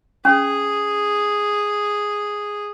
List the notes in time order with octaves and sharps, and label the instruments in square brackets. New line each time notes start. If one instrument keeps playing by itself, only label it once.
[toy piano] C#4 [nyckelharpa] G#4